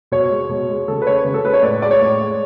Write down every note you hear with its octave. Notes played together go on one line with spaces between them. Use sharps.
B2 C#5
G#3
B2
G#3
C#3 A4
B4
G#3 C#5
C#3
A4
G#3 B4
C#5
A2 D5
G#3 D5
C#5
A2
G#3